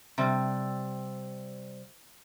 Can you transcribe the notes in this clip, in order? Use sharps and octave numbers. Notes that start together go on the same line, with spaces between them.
C3 G3